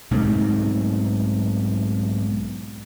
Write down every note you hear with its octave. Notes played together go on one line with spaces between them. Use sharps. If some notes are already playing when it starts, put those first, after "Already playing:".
B1 G#2 C3 A3